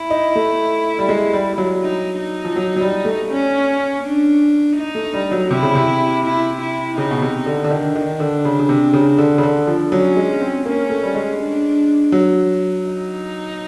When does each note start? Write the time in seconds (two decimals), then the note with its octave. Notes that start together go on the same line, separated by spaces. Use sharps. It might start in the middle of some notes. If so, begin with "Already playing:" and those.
Already playing: E4
0.10 D#4
0.36 A3
0.99 G3
1.09 G#3
1.33 G3
1.53 G3
1.58 F#3
1.83 D#4
2.19 D#4
2.45 F3
2.56 F#3
2.76 F#3
2.81 G3
3.05 A3
3.30 C#4
4.03 D4
4.76 D#4
4.95 A3
5.13 G3
5.32 F#3
5.51 C3 E4
5.63 C#3
5.75 C3
6.24 E4
6.61 E4
6.98 C#3 D#4
7.11 B2
7.22 C3
7.46 D3
7.64 D3
7.71 D#3 D4
7.96 D#3
8.08 D4
8.20 D3
8.45 C#3
8.59 C#3
8.69 C3
8.94 C#3
9.18 D3
9.38 C#3
9.43 D3
9.67 F3
9.92 F#3 C#4
10.16 G#3
10.41 C4
10.66 A#3 C#4
10.90 A3
11.03 G3
11.14 G#3
11.39 D4
12.12 F#3
12.86 D#4